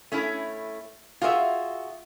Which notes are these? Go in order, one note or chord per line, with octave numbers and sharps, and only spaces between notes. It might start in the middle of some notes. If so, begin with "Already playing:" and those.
A3 C#4 E4
F4 F#4 G#4 C#5 E5